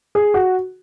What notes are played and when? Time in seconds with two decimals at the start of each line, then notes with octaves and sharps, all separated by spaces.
0.15 G#4
0.34 F#4